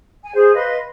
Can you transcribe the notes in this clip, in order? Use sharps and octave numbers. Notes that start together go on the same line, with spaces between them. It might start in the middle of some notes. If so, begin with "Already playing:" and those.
G#5
G#4 C5
B4 D#5 F5 C6